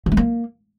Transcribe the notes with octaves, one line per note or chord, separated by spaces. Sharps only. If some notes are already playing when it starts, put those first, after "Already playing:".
D3
A3
A#3